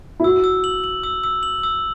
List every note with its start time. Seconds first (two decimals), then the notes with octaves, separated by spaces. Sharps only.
0.20 E4
0.24 F#4 E6
0.44 E6
0.64 F#7
0.84 F#7
1.03 E6
1.23 E6
1.43 F#7
1.63 E6